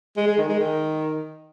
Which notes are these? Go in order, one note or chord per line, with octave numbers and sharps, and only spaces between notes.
G#3
G#3
D#3
G#3
D#3